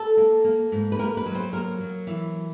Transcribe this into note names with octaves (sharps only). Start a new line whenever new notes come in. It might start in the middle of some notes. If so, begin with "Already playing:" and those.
Already playing: A4
A#3
A#3
G#2
B4
A#3 A#4
B4
F#3
C5
A#3 A#4
F#3
E3